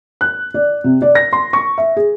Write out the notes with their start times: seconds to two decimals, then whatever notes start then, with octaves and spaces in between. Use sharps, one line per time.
0.21 F#6
0.54 D5
0.84 C3
1.02 D5
1.15 A#6
1.33 C6
1.53 C#6
1.78 E5
1.96 G#4